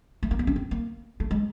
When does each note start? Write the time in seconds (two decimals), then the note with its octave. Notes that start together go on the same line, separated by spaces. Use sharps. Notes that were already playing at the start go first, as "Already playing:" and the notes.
0.23 A3
0.31 A#3
0.39 B3
0.47 C#4
0.56 C4
0.71 A#3
1.20 A3
1.31 G#3